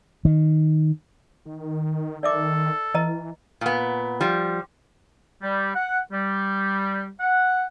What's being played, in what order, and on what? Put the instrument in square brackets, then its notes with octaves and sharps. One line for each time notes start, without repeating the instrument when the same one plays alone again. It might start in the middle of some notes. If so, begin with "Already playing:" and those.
[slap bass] D#3
[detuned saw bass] D#3
[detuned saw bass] D#3 [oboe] A4 [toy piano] D5 E5 D6
[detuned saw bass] E3 [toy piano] B4 D#5 A#5
[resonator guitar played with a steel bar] A#2 B3
F3 G3
[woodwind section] G3
F#5
G3
F#5